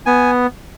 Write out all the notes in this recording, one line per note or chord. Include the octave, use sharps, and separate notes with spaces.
B3 G#5